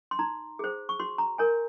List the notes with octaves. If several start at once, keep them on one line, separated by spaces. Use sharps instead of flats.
C6
D#4 A#5
G#4 C5
C#6
F#4 C6
A#5
A#4 C#5 G#5